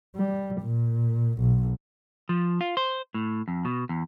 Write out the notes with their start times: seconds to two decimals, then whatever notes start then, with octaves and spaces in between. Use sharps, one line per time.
0.16 G3
0.61 A#2
1.39 B1
2.29 F3
2.61 F4
2.77 C5
3.14 A2
3.48 F2
3.65 B2
3.89 E2